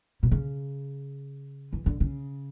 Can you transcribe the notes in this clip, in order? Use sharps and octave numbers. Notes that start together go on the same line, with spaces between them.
B2
C#3
E3
D3
C#3